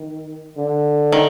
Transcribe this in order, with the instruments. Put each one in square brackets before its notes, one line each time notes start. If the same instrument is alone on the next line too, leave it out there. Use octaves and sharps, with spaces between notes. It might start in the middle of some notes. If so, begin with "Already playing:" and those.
Already playing: [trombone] D#3
D3
[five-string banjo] D#3